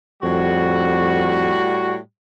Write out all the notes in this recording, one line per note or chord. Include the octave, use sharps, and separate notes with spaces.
F2 A2 G3 F#4